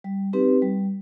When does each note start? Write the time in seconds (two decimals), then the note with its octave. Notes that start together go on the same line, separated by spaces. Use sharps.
0.04 G3
0.33 C4 D#4 G4 B4
0.62 G3